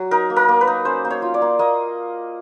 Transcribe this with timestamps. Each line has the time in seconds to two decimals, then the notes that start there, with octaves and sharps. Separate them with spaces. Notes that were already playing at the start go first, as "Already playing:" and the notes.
Already playing: F#3
0.11 D#4 A#4
0.30 A#3
0.36 A#4
0.48 A#3
0.61 B4
0.67 D#4
0.85 C#4 C5
1.05 A#3
1.11 C#5
1.22 F4
1.34 D5
1.42 A#3
1.59 A#3 D#5